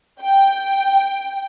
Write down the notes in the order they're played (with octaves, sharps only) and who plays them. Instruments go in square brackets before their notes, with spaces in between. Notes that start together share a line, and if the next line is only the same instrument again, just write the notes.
[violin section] G5